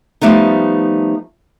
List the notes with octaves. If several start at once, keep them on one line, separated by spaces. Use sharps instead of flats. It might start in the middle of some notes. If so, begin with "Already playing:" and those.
F3 G3 A3 B3 D#4